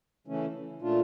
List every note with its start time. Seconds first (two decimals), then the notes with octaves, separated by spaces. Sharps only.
0.27 C#3 E3 A3 C#4
0.81 A#2 A3 D4 F4